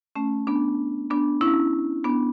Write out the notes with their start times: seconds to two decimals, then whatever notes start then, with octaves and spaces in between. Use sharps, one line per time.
0.16 A3 C#4
0.47 B3 D4
1.10 B3 D4
1.41 C#4 E4
2.04 B3 D4